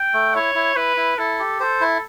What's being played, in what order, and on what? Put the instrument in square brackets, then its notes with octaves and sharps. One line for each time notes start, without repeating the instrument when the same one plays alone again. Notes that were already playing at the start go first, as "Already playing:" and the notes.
Already playing: [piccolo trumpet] G5
[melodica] A3
[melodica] E4 [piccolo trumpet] C#5
[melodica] E4
[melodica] E4 [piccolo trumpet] B4
[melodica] E4
[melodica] E4 [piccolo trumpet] A4
[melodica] G4
[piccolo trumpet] A4 [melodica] C5
[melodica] E4